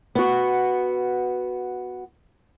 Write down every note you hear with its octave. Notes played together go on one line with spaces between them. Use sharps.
B3 F#4